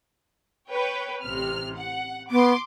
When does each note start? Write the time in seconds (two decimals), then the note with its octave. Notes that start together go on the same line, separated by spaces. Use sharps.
0.71 B4 C#5 G5
1.22 A1 C3 F6
1.78 F#5
2.31 B3 C6 D6